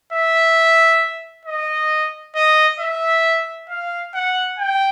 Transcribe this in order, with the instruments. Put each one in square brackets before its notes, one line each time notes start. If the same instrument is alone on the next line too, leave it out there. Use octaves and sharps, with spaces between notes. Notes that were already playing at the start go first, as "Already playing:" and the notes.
[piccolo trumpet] E5
D#5
D#5
E5
F5
F#5
G5